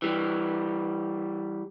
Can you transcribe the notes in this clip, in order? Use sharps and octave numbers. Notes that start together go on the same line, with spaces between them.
E3 G3